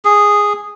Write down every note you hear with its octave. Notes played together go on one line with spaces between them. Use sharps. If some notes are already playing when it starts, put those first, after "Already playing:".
G#4